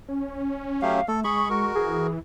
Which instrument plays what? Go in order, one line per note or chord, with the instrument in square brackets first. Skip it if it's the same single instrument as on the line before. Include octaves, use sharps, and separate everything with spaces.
[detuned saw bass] C#4
[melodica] F#3 A3 G4 [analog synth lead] F5
[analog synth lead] A3 [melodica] A4
[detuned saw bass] G#3 [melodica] G#4 B5 [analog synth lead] C#6
[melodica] F#4 A#4
[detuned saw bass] E3 [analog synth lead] G#4